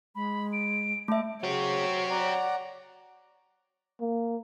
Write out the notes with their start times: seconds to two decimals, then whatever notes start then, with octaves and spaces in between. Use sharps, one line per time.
0.15 G#3 B5
0.52 D7
1.08 A3 E5 A5
1.43 C#3 F#3 C4 G4 C#5
2.10 D5 F#5 A#5
4.01 A#3